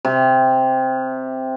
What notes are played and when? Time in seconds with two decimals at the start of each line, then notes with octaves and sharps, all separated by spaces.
0.05 C3